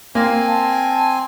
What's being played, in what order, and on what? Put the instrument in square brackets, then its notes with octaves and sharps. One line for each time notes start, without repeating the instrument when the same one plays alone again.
[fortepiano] A#3 [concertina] C4 G#5 [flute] F5
[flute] A5